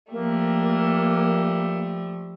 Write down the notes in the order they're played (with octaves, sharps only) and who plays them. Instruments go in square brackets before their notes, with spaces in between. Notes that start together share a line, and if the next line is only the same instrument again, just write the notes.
[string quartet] F3 G3 A3 [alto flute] A#3